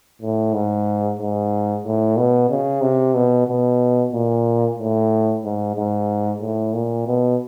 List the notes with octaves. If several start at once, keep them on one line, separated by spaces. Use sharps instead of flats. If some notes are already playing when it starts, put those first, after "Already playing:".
A2
G#2
G#2
A2
B2
C#3
C3
B2
B2
A#2
A2
G#2
G#2
A2
A#2
B2